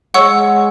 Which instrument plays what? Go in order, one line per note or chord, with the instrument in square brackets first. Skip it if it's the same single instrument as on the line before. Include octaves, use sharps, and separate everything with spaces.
[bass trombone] G#3 [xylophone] C#5 F#5 C#6 E6